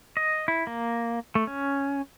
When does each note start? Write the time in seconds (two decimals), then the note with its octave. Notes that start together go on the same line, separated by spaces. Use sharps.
0.17 D#5
0.48 E4
0.67 A#3
1.35 A3
1.47 C#4